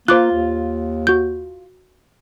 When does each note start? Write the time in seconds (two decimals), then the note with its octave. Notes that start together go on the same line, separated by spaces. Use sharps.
0.08 A#3 F4 C5 D6 F#6
0.32 D#2
1.07 F#4 G6